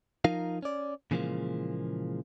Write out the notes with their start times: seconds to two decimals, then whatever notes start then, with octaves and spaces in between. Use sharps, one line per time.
0.25 F3 D#4 A#4 F5
0.62 C#4 D5
1.11 A#2 C#3 E3 F3 G#3 A#3